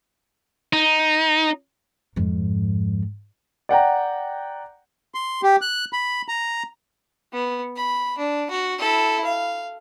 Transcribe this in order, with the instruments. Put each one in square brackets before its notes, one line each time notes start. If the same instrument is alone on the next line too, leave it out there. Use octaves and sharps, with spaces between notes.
[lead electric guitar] D#4
[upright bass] F2 G#2
[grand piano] D5 F#5 G5 A#5
[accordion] C6
G4
F#6
B5
A#5
[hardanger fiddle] B3
B5
D4
F#4
E4 A4
F5